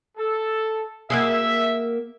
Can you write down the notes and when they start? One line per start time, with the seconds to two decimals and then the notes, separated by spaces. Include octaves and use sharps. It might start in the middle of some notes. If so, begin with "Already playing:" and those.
0.18 A4
1.10 A#3 F#4 G#4 E5